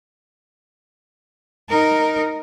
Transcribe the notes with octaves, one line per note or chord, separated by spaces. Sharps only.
D#4 A#4